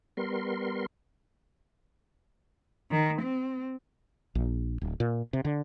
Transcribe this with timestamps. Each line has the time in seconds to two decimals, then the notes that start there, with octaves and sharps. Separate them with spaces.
0.17 G3 B3 A#4 C6
2.91 D#3
3.22 C4
4.35 A#1
4.82 D1
5.00 A#2
5.33 C3
5.45 D3